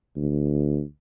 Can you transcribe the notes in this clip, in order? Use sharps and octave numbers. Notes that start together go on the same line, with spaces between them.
D2